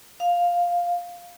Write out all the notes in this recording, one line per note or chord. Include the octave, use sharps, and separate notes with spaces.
F5